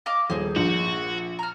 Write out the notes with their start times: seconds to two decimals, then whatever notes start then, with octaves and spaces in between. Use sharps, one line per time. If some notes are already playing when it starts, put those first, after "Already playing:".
0.06 D#5 F5 D6
0.30 D#1 G#4 C5
0.56 A#1 F#4
1.39 A#5 F6